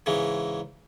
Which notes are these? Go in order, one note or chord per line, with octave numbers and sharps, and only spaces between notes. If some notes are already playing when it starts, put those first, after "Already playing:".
G#2 C#3 E3 G#3